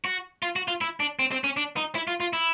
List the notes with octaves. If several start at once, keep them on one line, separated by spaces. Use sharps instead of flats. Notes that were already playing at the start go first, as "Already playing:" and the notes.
F#4
F4
F#4
F4
E4
D4
C4
C4
C#4
D4
D#4
E4
F4
F4
E4